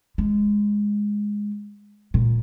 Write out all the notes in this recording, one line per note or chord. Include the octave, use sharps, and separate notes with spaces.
G#3
A#2